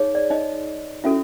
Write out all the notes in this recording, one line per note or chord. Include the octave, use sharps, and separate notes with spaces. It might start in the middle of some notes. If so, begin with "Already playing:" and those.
Already playing: D#4 G#4 C#5
D5
D#4 D#5
C#4 E4 F#4 A4 E5